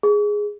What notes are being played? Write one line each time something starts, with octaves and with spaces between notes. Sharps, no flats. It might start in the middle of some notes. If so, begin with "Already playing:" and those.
G#4